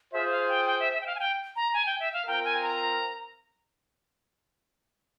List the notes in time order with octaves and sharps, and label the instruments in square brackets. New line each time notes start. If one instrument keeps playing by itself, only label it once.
[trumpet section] F4 G#4 C5 [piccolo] E5
[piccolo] F5
G5
G5
E5
E5
G5
F5
G#5
G5
A#5
G#5
G5
E5
F5
[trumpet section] C4 F4 A#4 [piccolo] G5
[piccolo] G#5
A#5